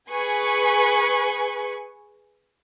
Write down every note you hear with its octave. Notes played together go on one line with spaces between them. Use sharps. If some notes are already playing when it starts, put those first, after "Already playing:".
G#4 B4 G#5 C#6